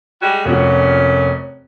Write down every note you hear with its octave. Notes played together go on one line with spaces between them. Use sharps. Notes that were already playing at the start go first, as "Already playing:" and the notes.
G3 G#3 F#4
F1 A#2 C#4 F#4